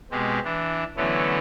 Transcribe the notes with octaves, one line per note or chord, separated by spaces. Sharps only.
B2 G#3 C4 G4
E3 D4
D3 E3 F#3 A3 B3 C#4